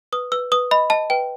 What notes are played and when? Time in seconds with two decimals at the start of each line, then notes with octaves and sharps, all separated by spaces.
0.12 B4 D#6
0.32 B4 E6
0.52 B4 D#6
0.71 D#5 B5
0.90 D#5 A5
1.10 B4 G5